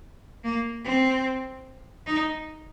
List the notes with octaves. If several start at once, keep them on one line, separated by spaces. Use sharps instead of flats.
A#3
C4
D#4